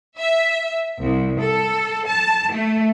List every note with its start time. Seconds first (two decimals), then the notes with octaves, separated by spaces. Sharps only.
0.17 E5
1.02 C2
1.40 A4
2.08 A5
2.53 A3